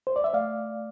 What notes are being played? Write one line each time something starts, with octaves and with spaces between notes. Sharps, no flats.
C5
D5
E5
A3 D5 F5